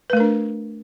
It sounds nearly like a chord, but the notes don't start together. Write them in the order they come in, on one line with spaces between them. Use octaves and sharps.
B4 A3 A#4 D4